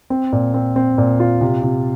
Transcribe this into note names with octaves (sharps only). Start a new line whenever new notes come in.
C4
A#2
C4
C4
A#2
F4
C3
C3